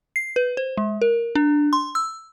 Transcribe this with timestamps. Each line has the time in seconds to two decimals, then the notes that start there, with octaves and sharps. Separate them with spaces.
0.16 C7
0.36 B4
0.57 C5
0.77 G#3
1.02 A#4
1.35 D4
1.73 C6
1.95 E6